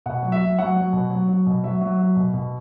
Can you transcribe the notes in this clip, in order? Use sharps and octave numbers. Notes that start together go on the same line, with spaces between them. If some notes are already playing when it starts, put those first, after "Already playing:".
B2 F#5
F#3
E5
F#3
F#3 F#5
F#3
B2
F#3
F#3
B2
F#3 E5
F#3
F#3
B2
B2